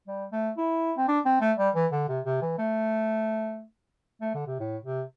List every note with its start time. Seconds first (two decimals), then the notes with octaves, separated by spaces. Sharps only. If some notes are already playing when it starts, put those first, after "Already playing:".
0.07 G3
0.32 A3
0.57 E4
0.97 C4
1.08 D4
1.25 C4
1.40 A3
1.58 G3
1.75 E3
1.92 D3
2.08 C3
2.25 C3
2.42 E3
2.58 A3
4.21 A3
4.34 D3
4.47 C3
4.60 A2
4.84 C3